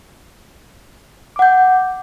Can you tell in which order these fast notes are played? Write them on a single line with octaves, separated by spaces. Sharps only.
D6 F#5 G6